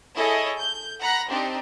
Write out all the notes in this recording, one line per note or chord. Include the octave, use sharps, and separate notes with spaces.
E4 G#4 A4 C#5 D#5
G6
F#5 A#5 B5 F#6 A#6
C4 D4 D#4 G4